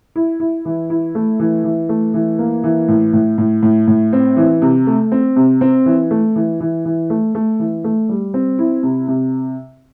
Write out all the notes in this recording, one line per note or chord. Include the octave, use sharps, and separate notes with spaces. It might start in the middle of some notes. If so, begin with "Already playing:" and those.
E4
E4
E3
E4
A3
E3
E3
A3
E3
A#3
E3
A2
A2
A2
A2
A2
C4
E3
C3
A3
C4
C3
C4
E3
A3
E3
E3
E3
A3
A3
E3
A3
G3
C4
E4
C3
C3